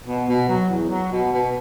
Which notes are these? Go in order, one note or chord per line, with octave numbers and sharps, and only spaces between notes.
B2
B2
F#3
E2
F#3
B2
B2